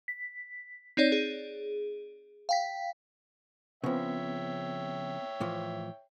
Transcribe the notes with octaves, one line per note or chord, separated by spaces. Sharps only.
B6
C4 D#4 C#5 D5
G#4
F5 G5 B6
C#3 F3 B3 C4 C#5 E5 G5
A2 E3 F3